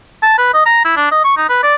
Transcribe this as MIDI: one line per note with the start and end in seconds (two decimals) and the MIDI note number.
0.23 0.36 81
0.38 0.52 71
0.54 0.61 75
0.66 0.81 82
0.85 0.96 64
0.96 1.11 62
1.11 1.20 75
1.24 1.33 85
1.37 1.48 63
1.49 1.59 71
1.63 1.76 74